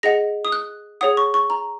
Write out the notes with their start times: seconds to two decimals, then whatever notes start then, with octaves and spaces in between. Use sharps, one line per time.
0.03 G#4 D#5 F#5 A#6
0.45 D#6
0.52 F#6
1.01 G#4 C#5 F#5 D#6
1.17 C#6
1.34 C#6
1.50 A#5